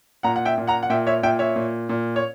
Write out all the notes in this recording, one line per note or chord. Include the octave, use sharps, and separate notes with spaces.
A#2 F#5 A#5
F#5
E5 G5
A#2
F#5 A#5
F#5
A#2 E5 G5
C#5 E5
A#2 E5 G5
C#5 E5
A#2
A#2
C#5